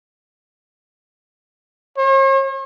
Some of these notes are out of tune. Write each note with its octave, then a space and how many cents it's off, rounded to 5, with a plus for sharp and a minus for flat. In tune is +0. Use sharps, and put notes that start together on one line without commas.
C#5 -45